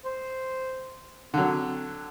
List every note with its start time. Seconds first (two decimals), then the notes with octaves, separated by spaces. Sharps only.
0.05 C5
1.34 D3 F#3 C4